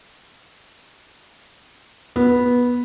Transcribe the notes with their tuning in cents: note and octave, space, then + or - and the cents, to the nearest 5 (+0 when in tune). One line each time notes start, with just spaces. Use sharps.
B3 -10